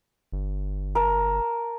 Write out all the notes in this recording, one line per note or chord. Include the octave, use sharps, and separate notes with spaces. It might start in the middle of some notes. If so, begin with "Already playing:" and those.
G1
A#4 A5